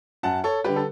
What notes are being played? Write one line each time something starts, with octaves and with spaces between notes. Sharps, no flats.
F#2 F#5 A5
A4 C#5
D3 G3 G4 B4
A4